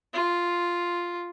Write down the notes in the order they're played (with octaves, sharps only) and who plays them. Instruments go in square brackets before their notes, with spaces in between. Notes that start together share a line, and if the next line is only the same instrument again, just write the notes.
[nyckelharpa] F4